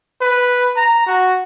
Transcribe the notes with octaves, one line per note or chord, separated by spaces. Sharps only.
B4
A#5
F#4